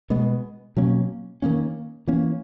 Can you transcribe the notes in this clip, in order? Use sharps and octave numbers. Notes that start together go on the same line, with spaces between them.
B2 G#3 B3
B2 F#3 A#3 C#4
D#3 F#3 A#3 C#4
E3 A#3 C#4